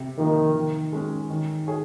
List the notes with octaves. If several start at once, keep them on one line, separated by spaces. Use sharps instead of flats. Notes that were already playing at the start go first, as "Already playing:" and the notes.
Already playing: C3
D#3 F3 A#3
D#3
G#3 C#4
D#3
G#4 C#5